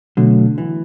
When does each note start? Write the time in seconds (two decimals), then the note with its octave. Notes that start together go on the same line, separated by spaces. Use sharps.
0.17 B2 D3 F#3 A3
0.58 E3